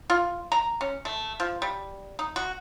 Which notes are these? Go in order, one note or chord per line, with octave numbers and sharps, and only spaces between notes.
F4
A#5
C#4
A3
F3
G3
D#4
F#4